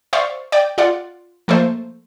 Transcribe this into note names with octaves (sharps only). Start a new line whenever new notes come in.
C5 D5 E5 F5 C#6
D5 G5
F4 D5 F#5
F3 A3 A#3 C5